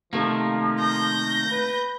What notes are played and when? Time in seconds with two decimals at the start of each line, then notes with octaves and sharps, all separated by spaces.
0.13 C3 D#3 F3 A3 A#3
0.80 G6 A#6
1.51 B4